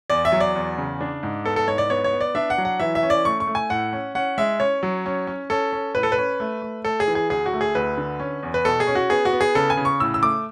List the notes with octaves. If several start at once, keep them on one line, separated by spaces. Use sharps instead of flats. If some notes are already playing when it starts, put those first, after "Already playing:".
E2 D5
E5
F#3
D5
E2
C#3
D4
G#2
B3 A4
A4
G#2 C#5
D5
B3 C#5
C#5
B3
D5
D4 E5
F#5
F#3
F#5
E3 E5
E5
C#4
D5
A3 C#6
C#6
A3
G#5
A2 F#5
C#4
C#4 F#5
G#3 E5
C#4 C#5
F#3
C#4
C#4
C#4 A4
C#4
A2 B4
A4
B4
C#4
A3
A3
A3 A4
G#4
E3
G#4
D2 G#4
F#4
A3
G#4
D2 B4
D3
C#4
E2
B4
B2 A4
G#4
C#4
F#4
B3 G#4
F#4
B3
G#4
C#3 A4
G#5
C#3
C#6
A2 E6
E6
A3 D6